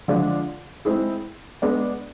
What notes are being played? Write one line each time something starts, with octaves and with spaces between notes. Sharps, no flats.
D3 F3 G#3 D4 F4
G#3 C4 E4 G#4
G#3 B3 D4